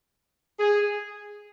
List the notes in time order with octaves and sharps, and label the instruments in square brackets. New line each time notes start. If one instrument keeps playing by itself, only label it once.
[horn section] G#4